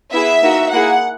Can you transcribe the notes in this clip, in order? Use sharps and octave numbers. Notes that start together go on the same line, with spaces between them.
B3 E4 G#4 E5
A#3 D#4 F#4
A#3 E4 G#4 F#5